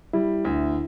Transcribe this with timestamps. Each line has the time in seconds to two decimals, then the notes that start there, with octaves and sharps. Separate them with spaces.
0.13 G3 E4
0.45 D2